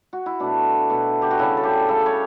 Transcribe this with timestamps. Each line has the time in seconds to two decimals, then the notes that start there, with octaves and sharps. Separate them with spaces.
0.13 F#4
0.26 E4
0.40 B2 A3 D4
0.90 B2 A3
1.22 G4
1.31 F#4
1.39 C#3 G3 E4
1.57 A4
1.64 G4
1.88 C#3 G3 A4
2.06 C#5